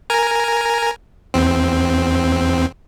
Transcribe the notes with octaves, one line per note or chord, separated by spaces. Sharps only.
A#4 G#5 A#5
E2 C4